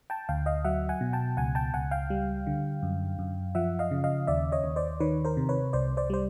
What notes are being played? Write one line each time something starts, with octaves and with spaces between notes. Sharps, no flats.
G5 A5
D2 F5 G5
D#5 F5
F#3 E5 F#5
F#5 G#5
B2
G5 A5
C#2 F#5 G#5
G5 A5
C#2 F#5 G#5
F5 G5
G3
D3
F#2
F#2
F3 E5 F#5
D#5 F5
C#3
D#5 F5
D#2 D5 E5
C#5 D#5
D#2
C5 D5
D#3 B4 C#5
A#4 C5
C3
B4 C#5
C2 C5 D5
C5 D5
G3 C5